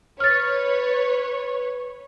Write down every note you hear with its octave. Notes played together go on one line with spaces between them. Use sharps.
B4 C#5 F6 A6